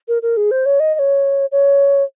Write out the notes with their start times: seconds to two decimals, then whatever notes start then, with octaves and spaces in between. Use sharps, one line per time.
0.08 A#4
0.22 A#4
0.37 G#4
0.51 C5
0.66 C#5
0.80 D#5
0.94 D#5
0.99 C#5
1.52 C#5